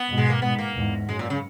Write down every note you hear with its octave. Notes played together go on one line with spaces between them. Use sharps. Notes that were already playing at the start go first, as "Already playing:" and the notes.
Already playing: B3
G#2 B2
G#3
A#3
G#2 B2 B3
A#3
E2 G#2
F#2 G#3
A#2
C#3